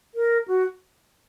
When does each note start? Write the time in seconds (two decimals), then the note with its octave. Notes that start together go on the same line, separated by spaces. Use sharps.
0.15 A#4
0.48 F#4